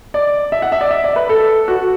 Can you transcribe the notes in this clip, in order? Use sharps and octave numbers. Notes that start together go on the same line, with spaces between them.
D5
E5
F#5
E5
D5
E5
D5
B4
A4
F#4